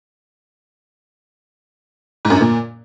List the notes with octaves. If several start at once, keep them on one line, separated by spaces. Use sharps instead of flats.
G#2
F#2
D3
A#2